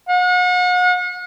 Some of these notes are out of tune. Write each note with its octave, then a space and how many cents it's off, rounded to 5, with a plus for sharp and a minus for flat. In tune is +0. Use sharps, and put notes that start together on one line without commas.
F#5 -40